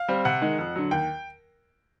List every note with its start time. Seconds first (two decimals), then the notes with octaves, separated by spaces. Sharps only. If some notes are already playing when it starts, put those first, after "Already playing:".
Already playing: F5
0.08 G3 C4
0.25 C3 F#5
0.41 D#3 G#3
0.59 F2
0.76 D3 F#3
0.91 D#2 G5